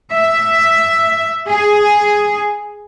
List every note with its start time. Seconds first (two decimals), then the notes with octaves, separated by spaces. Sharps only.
0.12 E5
1.49 G#4